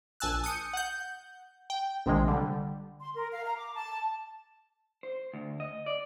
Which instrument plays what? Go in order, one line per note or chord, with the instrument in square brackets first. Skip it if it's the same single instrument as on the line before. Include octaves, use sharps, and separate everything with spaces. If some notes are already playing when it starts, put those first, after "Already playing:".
[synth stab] A#1 G#5 A5 E6 F#6
D#6 G6 C#7 D#7
F#5 G6
G5
A#1 C3 D#3 G#3
D3 G3
[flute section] C6
A#4
F5
A#5
D6
A5
[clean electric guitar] C5
D2
D#5
D5